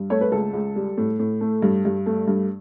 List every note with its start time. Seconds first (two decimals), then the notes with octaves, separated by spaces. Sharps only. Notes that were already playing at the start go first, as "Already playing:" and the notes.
Already playing: G2
0.10 A3 C#5
0.21 B4
0.32 C#2 A4
0.53 C#2
0.76 G3
0.97 A2
1.19 A2
1.41 A3
1.62 G2
1.85 G2
2.06 A3
2.28 G2